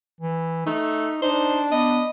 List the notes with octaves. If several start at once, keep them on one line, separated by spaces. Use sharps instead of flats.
E3
A3 D#4
D4 D#4 C5
B3 D#5